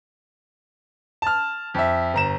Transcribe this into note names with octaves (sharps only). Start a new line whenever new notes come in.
A5 F6
F2 E5
G1 A#5 E7